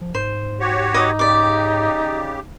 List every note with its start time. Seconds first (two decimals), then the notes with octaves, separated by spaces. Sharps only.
0.01 F3
0.15 G#2 C5
0.60 F#4 G4 C#5
0.94 D#4 B4 D#5 D6
1.19 C#3 G4 D5 D6